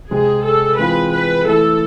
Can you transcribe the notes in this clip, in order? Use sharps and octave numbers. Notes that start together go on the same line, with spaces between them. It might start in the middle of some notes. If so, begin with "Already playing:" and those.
C3 G#3 C4 G#4
A4
E3 G#3 C4 F4 B4
B4
E3 A3 E4 A4